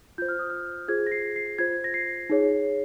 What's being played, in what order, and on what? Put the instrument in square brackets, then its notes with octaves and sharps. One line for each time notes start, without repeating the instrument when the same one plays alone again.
[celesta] F4 C5 G6
F6
D#6
F6
F4 G#4 C5 G#6
A#6
C7
C7
F4 C5 G#6
A#6
C7
D#4 G#4 C#5